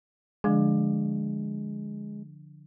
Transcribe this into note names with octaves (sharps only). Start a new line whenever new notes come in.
D3 F3 G#3 D4